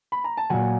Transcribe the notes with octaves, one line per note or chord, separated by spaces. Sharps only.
B5
A#5
A5
A#2 F#3 F#5 G#5